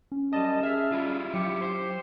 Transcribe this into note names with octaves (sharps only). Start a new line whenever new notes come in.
C#4
F#2 G3 D#5 A5
G#4 E5 F6
G3 E4 F4
F#3 G4 C#7
C5